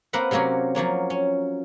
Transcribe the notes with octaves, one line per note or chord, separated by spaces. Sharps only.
A#3 C4 A#4 B4 F#5
C3 F#3 A#3 C4 C#4
F3 F#3 A#3 C#4
C#4